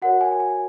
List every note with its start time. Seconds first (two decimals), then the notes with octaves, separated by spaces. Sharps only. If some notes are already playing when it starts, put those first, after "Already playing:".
0.02 F#4 A#4 C#5 F#5
0.21 G#5
0.40 G#5